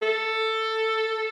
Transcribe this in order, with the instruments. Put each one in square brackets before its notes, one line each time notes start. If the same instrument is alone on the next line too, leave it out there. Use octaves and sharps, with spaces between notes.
[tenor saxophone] A4